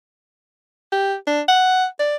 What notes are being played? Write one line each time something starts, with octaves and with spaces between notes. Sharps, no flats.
G4
D4
F#5
D5